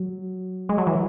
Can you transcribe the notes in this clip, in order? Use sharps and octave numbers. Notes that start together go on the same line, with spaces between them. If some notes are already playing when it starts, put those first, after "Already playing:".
Already playing: F#3
G#3
F#3
E3